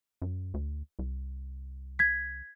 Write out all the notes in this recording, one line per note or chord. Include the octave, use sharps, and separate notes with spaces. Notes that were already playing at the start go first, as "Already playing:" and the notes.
F#2
D2
C2
G#6 B6